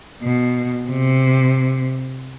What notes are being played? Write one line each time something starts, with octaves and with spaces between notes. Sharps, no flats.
B2
C3